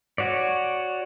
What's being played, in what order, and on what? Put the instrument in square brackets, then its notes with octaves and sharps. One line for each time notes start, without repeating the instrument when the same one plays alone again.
[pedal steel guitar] F#4 C#5 D5